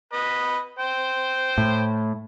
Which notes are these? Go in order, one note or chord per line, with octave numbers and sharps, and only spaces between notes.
B4 D#5
C5 G5
A2